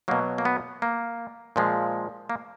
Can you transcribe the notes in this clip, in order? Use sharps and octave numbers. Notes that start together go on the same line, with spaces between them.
B2 F#3 A#3
A#3
B3
A#3
A#2 F3 G#3
A#3